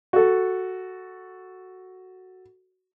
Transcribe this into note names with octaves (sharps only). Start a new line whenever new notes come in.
F#4 A4